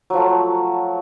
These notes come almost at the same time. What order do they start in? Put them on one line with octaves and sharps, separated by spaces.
F#3 F3 A3